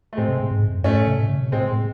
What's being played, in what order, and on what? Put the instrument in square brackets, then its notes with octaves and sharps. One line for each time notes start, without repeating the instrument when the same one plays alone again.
[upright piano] A3
[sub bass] A2 [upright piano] G#3 C4
[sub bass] C3
A2
G#2
F#2
[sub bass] G#2 [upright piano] A3 C#4
[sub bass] A2
C3
A2
C#3
C3
[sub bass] A2 [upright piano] G#3 C4
[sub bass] A2